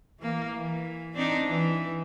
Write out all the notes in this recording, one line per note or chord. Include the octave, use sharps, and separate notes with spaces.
E3 A#3
E3
C4 D4 D#4
E3